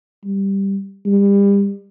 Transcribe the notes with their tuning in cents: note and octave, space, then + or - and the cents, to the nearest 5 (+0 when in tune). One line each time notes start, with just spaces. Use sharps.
G3 +0
G3 +35